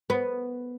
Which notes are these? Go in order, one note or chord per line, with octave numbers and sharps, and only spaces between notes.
B3